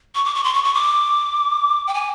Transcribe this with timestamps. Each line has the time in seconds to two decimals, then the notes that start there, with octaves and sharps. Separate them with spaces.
0.15 C#6
0.25 D6
0.35 C#6
0.44 C6
0.54 C#6
0.64 C#6
0.74 D6
1.87 G5
1.94 G#5